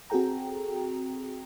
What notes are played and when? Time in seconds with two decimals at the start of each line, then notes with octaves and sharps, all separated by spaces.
0.10 C4 F#4 G#4 A4 G5 A#5